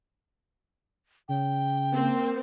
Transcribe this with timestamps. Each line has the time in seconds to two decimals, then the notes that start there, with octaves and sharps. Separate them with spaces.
1.29 C#3 G5
1.94 A#3 C4